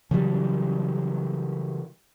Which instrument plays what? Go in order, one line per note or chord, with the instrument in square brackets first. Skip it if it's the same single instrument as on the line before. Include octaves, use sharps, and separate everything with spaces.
[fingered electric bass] C#3 E3 F#3 G3